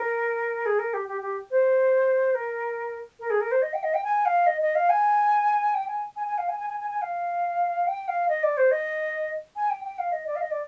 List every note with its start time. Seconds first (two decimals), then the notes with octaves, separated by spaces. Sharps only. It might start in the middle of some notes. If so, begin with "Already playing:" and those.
Already playing: A#4
0.66 G#4
0.79 A#4
0.93 G4
1.08 G4
1.21 G4
1.51 C5
2.35 A#4
3.20 A#4
3.30 G#4
3.41 A#4
3.51 C5
3.62 D#5
3.73 G5
3.83 D#5
3.94 G5
4.04 G#5
4.25 F5
4.46 D#5
4.61 D#5
4.75 F5
4.89 G#5
5.74 G5
5.88 G#5
6.16 G#5
6.27 G#5
6.38 F5
6.48 G#5
6.59 G#5
6.69 G#5
6.80 G#5
6.90 G#5
7.02 F5
7.87 G5
8.08 F5
8.28 D#5
8.43 D5
8.57 C5
8.71 D#5
9.56 G#5
9.70 G5
9.84 G5
9.99 F5
10.12 D#5
10.26 D5
10.36 F5
10.41 D#5
10.51 D5